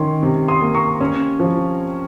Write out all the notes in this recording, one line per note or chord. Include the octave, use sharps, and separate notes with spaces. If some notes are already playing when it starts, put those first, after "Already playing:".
Already playing: D#3 C#4 C6
C3
C6 D#6
A#3
A#5 C#6
C#4
F3